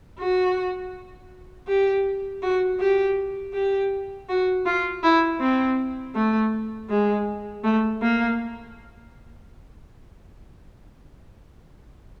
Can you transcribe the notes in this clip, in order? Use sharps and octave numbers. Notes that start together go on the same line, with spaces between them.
F#4
G4
F#4
G4
G4
F#4
F4
E4
C4
A3
G#3
A3
A#3